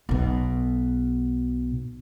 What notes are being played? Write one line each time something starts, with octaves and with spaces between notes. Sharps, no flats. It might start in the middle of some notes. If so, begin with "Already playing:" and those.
B1 B2